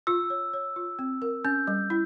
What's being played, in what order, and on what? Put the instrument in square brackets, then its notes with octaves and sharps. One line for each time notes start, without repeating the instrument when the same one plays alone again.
[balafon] F4 [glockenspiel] E6
[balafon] C#5
C#5
F4
C4
A#4
[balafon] C#4 [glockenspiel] G6
[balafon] G3
E4